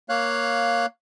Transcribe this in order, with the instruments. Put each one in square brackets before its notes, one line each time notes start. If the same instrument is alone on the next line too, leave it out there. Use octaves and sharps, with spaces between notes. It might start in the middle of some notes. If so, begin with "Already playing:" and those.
[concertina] A#3 C#5 F5 F#6